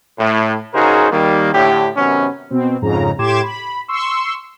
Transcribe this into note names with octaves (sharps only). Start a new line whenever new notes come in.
A2
C#3 D#4 F#4 G#4 A#4 C5
D#3 G3 A#3
A2 D3 G4
F#2 C3 D#3 B3 C#4
B2 C4
F2 G#2 C#3 A#5
A2 G4 C6 D6 G#6 E7
B5
C6 C#6 E6